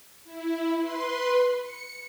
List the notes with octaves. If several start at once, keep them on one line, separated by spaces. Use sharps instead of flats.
E4
B4 C6
C#7